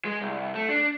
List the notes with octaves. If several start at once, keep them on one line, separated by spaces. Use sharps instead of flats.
G#3
C2
A3
D4